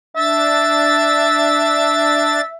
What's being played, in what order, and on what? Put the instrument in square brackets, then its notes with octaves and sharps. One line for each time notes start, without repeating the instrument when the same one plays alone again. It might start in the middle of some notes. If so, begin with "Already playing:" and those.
[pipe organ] D4 A6 [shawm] E5